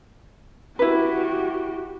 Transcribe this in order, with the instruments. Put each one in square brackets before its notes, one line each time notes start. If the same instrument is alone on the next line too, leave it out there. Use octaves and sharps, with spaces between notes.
[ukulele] E4 B4 [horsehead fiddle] F#4 G4